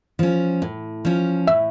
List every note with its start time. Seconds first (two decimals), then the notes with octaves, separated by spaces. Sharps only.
0.19 F3 C#4
0.62 A2
1.05 F3 C#4
1.47 A2 E5